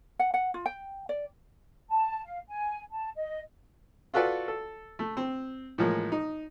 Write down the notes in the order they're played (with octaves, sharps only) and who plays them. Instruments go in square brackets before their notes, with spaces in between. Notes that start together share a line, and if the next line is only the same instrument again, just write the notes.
[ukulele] F#5
F#5
F4
G5
D5
[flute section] A5
F5
G#5
A5
D#5
[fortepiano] F4 F#4 A4 B4 D5
A4
A3
C4
A2 E3 F3 G#3 A#3
D#4